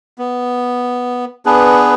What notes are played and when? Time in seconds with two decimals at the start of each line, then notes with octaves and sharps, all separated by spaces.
0.18 B3
1.46 B3 D4 G#4 B4